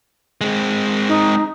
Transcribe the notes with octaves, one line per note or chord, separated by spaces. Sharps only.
G#3 C4
D#4